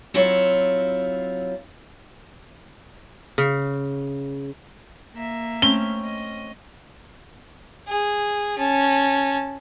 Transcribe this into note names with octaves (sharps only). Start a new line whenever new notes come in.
F#3 C4 E4 F4 C#5
C#3
A#3 E5
A3 C4 C#4 G7
D#5
G#4
C#4 A5